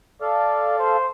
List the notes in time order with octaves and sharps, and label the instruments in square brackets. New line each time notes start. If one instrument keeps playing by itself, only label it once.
[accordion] A4 F5 [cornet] D5
[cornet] C5